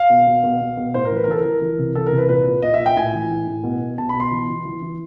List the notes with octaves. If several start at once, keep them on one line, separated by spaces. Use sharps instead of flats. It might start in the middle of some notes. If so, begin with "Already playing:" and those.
Already playing: F5
B2
B2
B2
B2
B2
A2 C5
A#4
E3
B4
A#4
E3 A4
A#4
E3
E3
C3
E3 A4
A#4
C3
B4
A#2 B4
A#2
A#2 D#5
E5
A#2
G5
A2 G#5
E3
A2
A2
B2
B2
B2 A5
B2 B5
C6
E3
E3
E3
E3